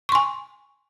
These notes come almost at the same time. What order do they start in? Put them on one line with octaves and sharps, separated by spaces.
C#6 C6 G#5